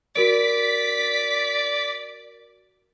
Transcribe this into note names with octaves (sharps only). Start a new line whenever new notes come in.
F#4 A#4 D5 B6 D7